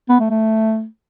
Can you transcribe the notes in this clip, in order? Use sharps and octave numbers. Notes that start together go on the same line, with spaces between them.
B3
A3
A3